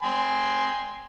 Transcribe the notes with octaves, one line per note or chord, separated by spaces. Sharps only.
G5 G#5 C6